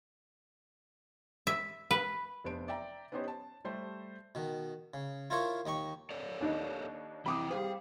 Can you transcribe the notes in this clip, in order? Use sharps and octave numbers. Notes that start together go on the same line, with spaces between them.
E5
B4
F1 B3 D4 C5 D7
D5 E5 G5 A#5
B3 C#4 D#4 G4 C5 C#5
A5
G3 A3 C5
B2 D#3
C#3
E4 F4 A#4 C5 C#5 F5
D#2 D#4 G5 C#6
A4 C#5 D5
D#2 D4 D#4
C2 F2 E3 E4 G5 B5 D6 D#6
G3 G4 G#4 C5 F5